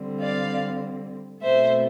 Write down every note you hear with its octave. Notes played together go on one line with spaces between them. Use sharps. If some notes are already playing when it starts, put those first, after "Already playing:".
Already playing: D3 G3 C4
D5 F5
B2 A3 C4 C5 E5